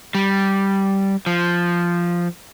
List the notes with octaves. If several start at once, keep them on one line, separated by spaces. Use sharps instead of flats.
G3
F3